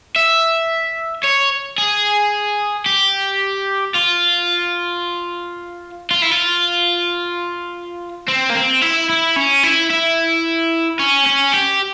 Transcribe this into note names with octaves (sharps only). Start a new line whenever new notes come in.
E5
C#5
G#4
G4
F4
F4
E4
F4
C4
A#3
C4
E4
E4
C#4
E4
E4
C#4
C#4
G4